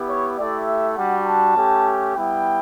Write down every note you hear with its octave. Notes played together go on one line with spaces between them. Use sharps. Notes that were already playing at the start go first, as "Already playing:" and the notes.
Already playing: B3 E4 G4
C#5
A3 E4 G4 D5
E5
G3 D4 F#4 F#5
A5
A3 C#4 G4
G3 B3 E4 G5